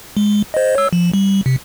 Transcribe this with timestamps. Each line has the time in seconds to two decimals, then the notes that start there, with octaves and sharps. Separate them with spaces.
0.17 G#3
0.54 C5 D#5
0.75 C#5 E6
0.93 F3
1.14 G3
1.46 C3